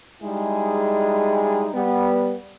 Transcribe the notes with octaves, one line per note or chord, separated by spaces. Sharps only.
G3 G#3 D#4 E4 G#4
G3 B3